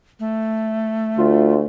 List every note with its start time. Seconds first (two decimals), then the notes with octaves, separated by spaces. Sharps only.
0.20 A3
1.18 D2 F4